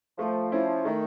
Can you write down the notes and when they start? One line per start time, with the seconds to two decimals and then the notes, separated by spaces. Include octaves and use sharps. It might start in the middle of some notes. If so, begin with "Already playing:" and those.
0.18 F3 A3
0.52 F3 C#4 E4
0.85 D#3 A3